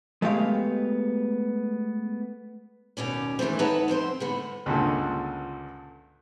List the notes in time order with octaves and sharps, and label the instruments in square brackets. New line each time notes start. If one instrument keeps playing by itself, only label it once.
[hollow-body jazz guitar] G#3 A3 B3 G4 D5 F5
[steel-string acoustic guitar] D#2 B2 C#4 D5
D#3 E3 F#3 A3 C4
D#4 B4 C#5 E5 F#5 A5
F2 C4 G#4 C5
A2 D3 B3
[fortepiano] C#2 G2 A#2 D3